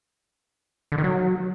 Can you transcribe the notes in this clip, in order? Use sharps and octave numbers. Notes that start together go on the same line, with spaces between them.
D3
D#3
F#3